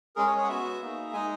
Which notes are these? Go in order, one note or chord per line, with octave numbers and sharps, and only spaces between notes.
G#3 C#4 G#4 A#4
C#5
C#5
F#5
B3 F#4 E5
A#3 D#4 G#4
G#3 D#4 G#4 G#5